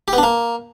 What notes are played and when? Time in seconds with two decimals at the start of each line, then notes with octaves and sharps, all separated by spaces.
0.08 G4
0.13 B3
0.18 D4
0.23 A#3